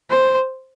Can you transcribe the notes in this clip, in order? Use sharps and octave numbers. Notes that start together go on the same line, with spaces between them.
C5